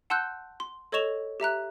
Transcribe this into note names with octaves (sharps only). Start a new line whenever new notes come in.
F#5 A5 C6 E6 F#6 G6
C6
A4 C#5 D#5 C#6 E7 F7
G4 E5 A#5 F#6